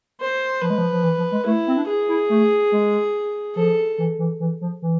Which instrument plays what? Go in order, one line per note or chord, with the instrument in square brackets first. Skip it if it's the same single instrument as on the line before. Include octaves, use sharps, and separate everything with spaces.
[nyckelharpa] C5
[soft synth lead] F3 [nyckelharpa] B4
[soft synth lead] G#3
F3
F3
E3
F3
G#3
[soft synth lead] A3 [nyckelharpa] E4
[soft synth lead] C4
D4
[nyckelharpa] G#4
[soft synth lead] E4
A3
G#3
[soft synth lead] F3 [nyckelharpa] A4
[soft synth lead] E3
E3
E3
F3
E3